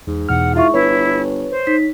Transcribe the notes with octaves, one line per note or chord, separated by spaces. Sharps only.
E2 G#2
E2 B2 F#5 F6
E4 F4 E5 C#6
G1 E4 B4 C#5
C5
D#4 B6